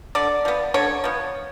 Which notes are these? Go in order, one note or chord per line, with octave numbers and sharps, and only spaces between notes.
D3 D5
F3 B3
D3 C#5
F3 B3